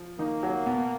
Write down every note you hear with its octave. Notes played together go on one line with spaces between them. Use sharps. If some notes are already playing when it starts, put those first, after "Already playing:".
Already playing: F3
D#3 A#3 D#4
F#3 F#4
B2 B3